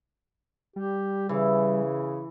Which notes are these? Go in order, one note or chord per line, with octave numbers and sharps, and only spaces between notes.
G3 G4
C#3 E3